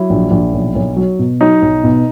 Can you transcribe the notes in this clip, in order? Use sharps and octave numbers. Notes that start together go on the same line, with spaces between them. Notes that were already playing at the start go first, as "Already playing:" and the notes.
Already playing: F#3 E4
A#1
A#1
B1
B1
F#3
B2
F#3 D#4
B1
B2